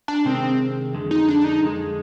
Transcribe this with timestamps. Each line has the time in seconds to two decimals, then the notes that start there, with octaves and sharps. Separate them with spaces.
0.08 D4
0.25 C3 D#3 G#3 C4
0.94 F2 D3 G#3
1.11 D#4
1.28 D4
1.44 D#4
1.62 F2 D3 G#3